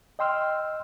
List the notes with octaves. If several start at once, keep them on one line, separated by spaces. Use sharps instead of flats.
D#5 G5 C6 E6 F6